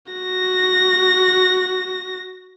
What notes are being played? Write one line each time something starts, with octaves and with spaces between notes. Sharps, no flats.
F#4 A#6